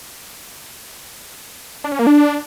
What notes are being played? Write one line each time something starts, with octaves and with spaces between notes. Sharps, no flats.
D4
C#4
A#3
D4